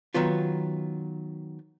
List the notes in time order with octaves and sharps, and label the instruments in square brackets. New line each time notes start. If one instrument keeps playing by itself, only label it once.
[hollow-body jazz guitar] D#3 F#3 B3 F4